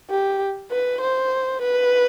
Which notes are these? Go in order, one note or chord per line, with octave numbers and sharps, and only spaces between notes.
G4
B4
C5
B4